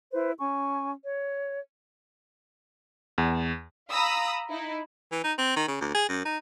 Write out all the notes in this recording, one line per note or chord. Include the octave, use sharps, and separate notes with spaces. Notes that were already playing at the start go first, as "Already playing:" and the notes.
E4 B4 C5
C#4 G#5 C#6
C#5
E2
F5 A#5 B5 D#6 E6
D#4 E4
E3
D#4
C4
D#3
C#3
D2
G#4
F#2
D#4